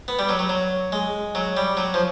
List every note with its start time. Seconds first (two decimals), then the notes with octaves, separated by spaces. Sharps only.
0.08 B3
0.19 G3
0.29 F#3
0.39 F#3
0.49 F#3
0.92 G#3
1.35 F#3
1.57 G3
1.77 F#3
1.94 F3